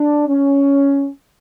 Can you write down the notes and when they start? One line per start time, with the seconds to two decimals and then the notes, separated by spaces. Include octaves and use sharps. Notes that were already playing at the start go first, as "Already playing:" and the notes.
Already playing: D4
0.27 C#4